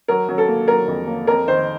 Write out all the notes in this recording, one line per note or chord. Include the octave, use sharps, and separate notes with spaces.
F#3 A#4
F#3
A4
A#3
F#3 A#4
F2
A#3
F2 A#4
D#3 C5